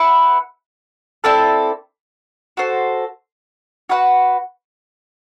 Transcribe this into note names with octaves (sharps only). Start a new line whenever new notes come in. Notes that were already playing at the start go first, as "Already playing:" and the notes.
Already playing: E4 B4 F#5
C4 E4 A4 D5
F#4 A4 C5
F#4 B4 F#5